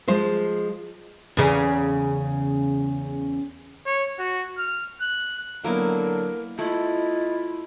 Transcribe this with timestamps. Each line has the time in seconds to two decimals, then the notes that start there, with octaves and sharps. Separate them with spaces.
0.08 F3 G#3 C5
1.37 E2 C#3
3.86 C#5
4.19 F#4
4.58 F6
5.01 F#6
5.64 D3 F#3 A#3 B3 E4 A#4
6.59 A3 E4 F4 D#5